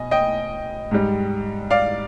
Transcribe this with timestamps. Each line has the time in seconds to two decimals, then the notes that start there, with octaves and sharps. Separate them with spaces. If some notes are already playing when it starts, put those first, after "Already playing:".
Already playing: B2 D#5 G#5
0.11 D#5 G5
0.91 G#2 G3
1.71 D5 F5